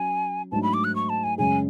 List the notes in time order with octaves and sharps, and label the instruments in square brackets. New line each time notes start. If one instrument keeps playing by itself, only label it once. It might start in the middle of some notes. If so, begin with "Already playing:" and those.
Already playing: [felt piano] F#3 C#4 [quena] G#5
[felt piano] G#2 F#3 A3 D4 [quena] A5
[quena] B5
D6
F#6
C#6
A5
G#5
[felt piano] F#2 C#3 G#3 C#4 G#4 [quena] G#5